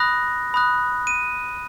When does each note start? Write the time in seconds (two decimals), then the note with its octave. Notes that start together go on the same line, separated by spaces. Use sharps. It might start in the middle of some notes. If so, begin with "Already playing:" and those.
Already playing: B5 D#6 F#6 A#6
0.54 B5 D#6 F#6
1.07 D#7